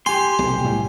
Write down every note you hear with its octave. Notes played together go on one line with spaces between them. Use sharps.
G4 G#5 C6
B1 C3
A2 C3 G3